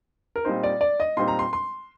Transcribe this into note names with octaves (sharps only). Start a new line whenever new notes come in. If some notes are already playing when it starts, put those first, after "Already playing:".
A#4
A#2 G3 C4 D#4 C5
D5
D5
D#5
A#2 G3 C4 D#4 C6
A#5
C6
C6